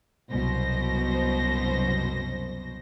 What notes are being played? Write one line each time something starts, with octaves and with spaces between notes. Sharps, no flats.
C2 F#2 B2 C5 A#6